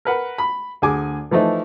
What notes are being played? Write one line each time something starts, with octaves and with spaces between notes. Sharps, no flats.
A#4 B4 F#5
B5
D2 G#4 G#5 D6
E3 F3 A3 D#4